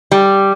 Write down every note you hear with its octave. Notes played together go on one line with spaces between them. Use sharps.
G3